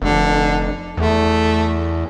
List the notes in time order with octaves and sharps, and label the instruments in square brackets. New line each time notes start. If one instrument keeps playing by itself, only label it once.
[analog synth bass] F1 [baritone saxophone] D3
[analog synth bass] E2 [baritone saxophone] A3